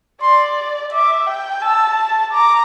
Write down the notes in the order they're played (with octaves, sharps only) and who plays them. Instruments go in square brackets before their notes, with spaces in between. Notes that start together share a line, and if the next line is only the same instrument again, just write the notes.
[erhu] D5 [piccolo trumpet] C6
[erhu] E5 [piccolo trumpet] D6
[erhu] G5
[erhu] A5 [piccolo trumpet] E6
[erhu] A#5 [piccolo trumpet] D6